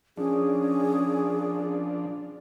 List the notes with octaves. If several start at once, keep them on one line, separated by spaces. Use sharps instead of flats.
F3 C#4 D4 G#4